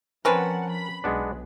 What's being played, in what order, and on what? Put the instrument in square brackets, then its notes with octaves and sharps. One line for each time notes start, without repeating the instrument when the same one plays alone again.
[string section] F3 F#5 [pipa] C4 C#4 B4 [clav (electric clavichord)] A#4 A5
[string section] B5
[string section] B1 [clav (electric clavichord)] G#3 B3 D4